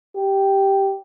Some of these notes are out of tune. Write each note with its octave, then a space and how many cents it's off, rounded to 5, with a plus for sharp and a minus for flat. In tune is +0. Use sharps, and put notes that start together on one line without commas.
G4 -5